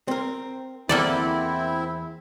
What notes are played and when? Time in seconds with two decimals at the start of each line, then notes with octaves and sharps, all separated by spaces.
0.08 C4 A#4
0.89 E2 A#3 C4 E4 A4 D5